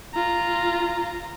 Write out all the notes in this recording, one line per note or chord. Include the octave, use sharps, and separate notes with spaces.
F4 A#5